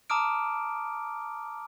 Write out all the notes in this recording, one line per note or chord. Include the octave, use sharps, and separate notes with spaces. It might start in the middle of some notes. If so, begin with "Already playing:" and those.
A5 A#5 D6 D#6 F6 D7